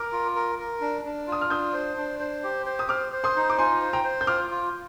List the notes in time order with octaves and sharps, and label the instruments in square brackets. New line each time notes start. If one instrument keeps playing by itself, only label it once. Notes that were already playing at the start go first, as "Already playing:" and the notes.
Already playing: [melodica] A#4 [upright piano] D6 F6
[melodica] F4
A#4
A#4
D4
D4
[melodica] F4 [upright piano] D#6
[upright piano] F6
[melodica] D4 [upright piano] D#6 G6
[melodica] C5
D4
C5
G4
C5
[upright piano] D#6
[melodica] C5 [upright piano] D6 F6
[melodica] C5
[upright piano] C6 D#6
[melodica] D#4
[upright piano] D6
[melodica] F4 [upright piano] G#5 C6
[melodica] C5
[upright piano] G5 A#5
[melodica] C5
[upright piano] G6
[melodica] F4 [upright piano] D6 F6
[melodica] F4